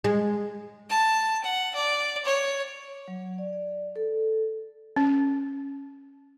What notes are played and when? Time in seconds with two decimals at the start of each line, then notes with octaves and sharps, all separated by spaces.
0.04 G#3
0.89 A5
1.43 F#5
1.75 D5
2.25 C#5
3.08 F#3
3.38 D5
3.53 D5
3.96 A4
4.96 C#4